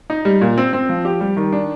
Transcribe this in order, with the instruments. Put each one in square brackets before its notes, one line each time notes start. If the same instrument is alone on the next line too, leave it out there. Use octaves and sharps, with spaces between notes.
[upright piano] D#4
G3
A#2
C4
C4
F3
G4
G3
D#3
D4